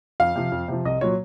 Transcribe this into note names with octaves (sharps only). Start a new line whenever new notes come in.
F2 F5
C3 F3
F2
C3 F3
C2 D#5
A#2 F#3 C#5